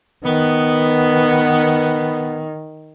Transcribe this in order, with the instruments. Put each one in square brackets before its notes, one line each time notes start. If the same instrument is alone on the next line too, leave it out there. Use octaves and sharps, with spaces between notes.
[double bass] D#3 [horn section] B3